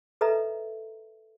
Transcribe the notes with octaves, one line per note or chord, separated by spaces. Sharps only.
A4 B4 D#5 E5 A#5